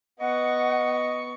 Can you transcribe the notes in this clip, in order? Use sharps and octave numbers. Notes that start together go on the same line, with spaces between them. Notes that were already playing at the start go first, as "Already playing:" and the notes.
B3 D#5 F#5 C#6